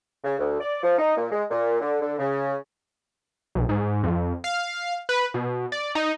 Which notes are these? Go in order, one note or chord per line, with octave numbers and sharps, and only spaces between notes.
C#3
D2
D5
F3
D#4
A#2
G#3
A#2
D3
D3
C#3
B1
G#2
F2
F5
B4
B2
D5
D#4